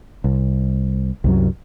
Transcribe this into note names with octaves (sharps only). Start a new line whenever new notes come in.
C2
C2 F#2 F#3